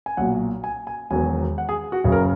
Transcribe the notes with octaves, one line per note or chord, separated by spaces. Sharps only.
G#5
B1 A#2 F#3 F#5
G#5
G#5
E1 E2 D#3 F#3 G#5
F#5
G#4
F#4
F#1 F#2 C#3 F#3 G#4
A#4